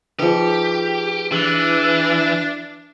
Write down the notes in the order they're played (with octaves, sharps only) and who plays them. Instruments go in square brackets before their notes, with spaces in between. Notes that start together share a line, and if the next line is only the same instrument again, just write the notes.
[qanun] F3 D#4 [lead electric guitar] G4 [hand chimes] G#4 B4
[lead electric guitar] E3 [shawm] D4